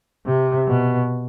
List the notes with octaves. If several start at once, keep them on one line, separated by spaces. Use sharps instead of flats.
C3
B2